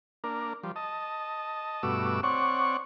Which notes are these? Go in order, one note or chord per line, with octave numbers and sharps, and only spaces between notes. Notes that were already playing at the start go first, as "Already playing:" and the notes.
A#3 D4 A#4
F3 G3
D#5 A5
G2 B2 A3 F#4 D6 E6
C4 C#5 D5 F#5 C#6